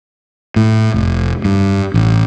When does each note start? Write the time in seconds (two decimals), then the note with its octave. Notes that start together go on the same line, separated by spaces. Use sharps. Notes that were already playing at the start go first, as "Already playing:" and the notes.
0.56 A2
0.94 F1
1.45 G2
1.94 A1